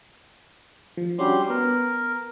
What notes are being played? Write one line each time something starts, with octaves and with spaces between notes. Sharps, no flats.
F3
G3 C#4 D4 F#4 G4 C6
B3 A#4